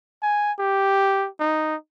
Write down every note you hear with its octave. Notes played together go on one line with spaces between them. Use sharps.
G#5
G4
D#4